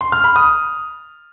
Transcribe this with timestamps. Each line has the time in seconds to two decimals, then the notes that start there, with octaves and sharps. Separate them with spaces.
0.01 C6
0.12 F6
0.24 B5
0.36 D#6